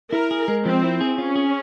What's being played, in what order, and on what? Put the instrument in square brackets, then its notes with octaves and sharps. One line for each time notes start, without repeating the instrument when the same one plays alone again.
[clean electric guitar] E4 [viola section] A#4
[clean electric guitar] G#4
G#3
[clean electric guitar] F3 [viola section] C4
[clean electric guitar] E4
G#4
[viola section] C#4 [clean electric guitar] F4
[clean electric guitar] G#4